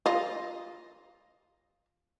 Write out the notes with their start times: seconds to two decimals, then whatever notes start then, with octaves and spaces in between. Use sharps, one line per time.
0.06 F4 D#5